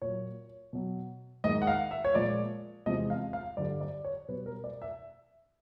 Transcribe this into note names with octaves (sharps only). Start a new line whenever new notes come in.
A#2 F#3 C#5
B2 F#3
G#2 D#3 G#3 D#5
F#5
F5
E5
C#5
A#2 F3 G#3 D5
E2 C3 F3 G#3 D#5
F5
F5
G2 D3 G3 D5
D5
C#5
B2 G3 B4
A#4
D5
E5